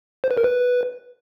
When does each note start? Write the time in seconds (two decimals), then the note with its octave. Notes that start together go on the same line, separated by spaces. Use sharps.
0.24 C5
0.31 B4
0.37 A#4
0.44 B4